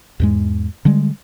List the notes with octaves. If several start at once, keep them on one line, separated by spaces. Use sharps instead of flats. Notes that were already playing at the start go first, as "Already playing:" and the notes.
E2 G#2 G#3
D3 G3 G#3